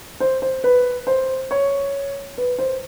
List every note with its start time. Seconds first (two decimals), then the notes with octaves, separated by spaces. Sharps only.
0.20 C5
0.42 C5
0.64 B4
1.07 C5
1.51 C#5
2.38 B4
2.59 C5